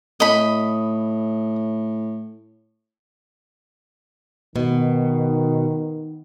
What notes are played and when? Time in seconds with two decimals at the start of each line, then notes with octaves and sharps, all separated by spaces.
0.20 A2 D#5 B5
4.56 B2 D#3